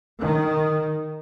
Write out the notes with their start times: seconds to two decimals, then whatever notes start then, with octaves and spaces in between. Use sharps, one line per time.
0.21 D#3